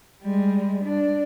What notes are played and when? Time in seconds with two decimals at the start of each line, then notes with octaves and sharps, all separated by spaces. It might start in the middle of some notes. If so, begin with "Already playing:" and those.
0.23 G3 G#3
0.84 D4